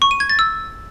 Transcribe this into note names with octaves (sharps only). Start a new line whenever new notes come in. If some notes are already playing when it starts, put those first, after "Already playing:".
C#6
D#7
G#6
A6
E6